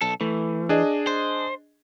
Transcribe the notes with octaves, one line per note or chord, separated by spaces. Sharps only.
B1 A4
E3 A3
D4 G#4 D#5
C5